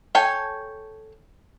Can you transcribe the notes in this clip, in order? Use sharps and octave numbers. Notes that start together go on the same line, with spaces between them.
A4 C#5 G5 G#5